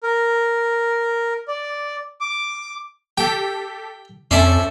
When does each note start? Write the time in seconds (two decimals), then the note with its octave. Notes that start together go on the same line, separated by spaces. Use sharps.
0.03 A#4
1.48 D5
2.21 D6
3.17 G4 A4 G5 B6
4.31 F2 C#4 A4 C5 D5 E5